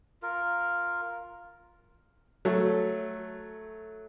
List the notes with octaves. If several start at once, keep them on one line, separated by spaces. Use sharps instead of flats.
F4 A#4
F#3 A3